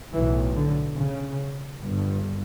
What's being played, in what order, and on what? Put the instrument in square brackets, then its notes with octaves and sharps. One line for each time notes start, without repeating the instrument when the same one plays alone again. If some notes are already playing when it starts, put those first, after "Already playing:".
[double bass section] B1 A2 E3
D3
C#3
G1 G2